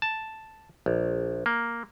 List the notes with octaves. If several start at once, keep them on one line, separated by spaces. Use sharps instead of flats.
A5
A#1
A#3